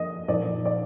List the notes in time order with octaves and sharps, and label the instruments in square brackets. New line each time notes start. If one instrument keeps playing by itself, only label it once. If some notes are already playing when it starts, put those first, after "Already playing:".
Already playing: [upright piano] F3 A#3 D4 D#5
A#2 F3 A#3 D#4 D5
D5